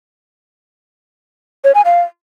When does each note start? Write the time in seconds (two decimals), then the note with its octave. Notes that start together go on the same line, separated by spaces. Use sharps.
1.64 C#5
1.75 G#5
1.85 F5